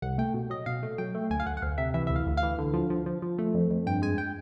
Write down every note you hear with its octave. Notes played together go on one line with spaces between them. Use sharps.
C2 F#5
A3 G5
B2
F#3 D#5
B2 F5
A3
F#3 G5
A3
D2 G#5
F5
D2 F#5
F#5
D2 F5
C3 E5
E3 E5
D2 E5
F5
D2
F5
E3
D3
F3
F3
F3
F3
A3
F2
F2
G2 G5
G#3 G#5
G5